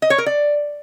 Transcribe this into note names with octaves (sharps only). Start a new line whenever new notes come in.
D#5
C#5
A#4
D5